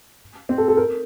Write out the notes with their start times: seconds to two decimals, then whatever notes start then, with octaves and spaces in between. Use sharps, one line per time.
0.49 C4
0.58 A4
0.68 A4
0.77 A#4